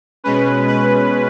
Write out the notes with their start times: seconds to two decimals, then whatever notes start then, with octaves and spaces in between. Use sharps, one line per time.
0.24 B2 G#3 C#4 B4
0.68 B4